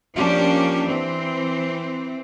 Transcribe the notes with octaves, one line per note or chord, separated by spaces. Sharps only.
F3 A#3 C#4 D4 G4
E3 C4